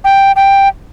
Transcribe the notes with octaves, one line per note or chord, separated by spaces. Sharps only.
G5
G5